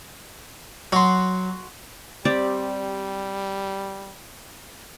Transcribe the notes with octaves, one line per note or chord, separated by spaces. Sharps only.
F#3 F#4 C6
G3 C4 G4 D5